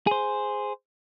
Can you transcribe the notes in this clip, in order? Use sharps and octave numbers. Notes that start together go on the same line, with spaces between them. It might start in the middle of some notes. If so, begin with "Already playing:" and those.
G#4 C5